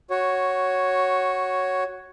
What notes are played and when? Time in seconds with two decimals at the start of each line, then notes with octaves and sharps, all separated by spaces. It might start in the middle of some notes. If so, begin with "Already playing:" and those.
0.10 F#4 C#5